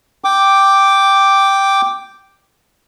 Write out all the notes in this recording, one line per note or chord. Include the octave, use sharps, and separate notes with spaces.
G5 D6